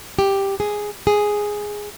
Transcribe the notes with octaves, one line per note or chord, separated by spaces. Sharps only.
G4
G#4
G#4